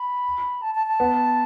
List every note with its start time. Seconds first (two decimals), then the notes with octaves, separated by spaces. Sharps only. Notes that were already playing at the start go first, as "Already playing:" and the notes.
Already playing: B5
0.62 A5
0.75 A5
0.87 A5
1.00 B3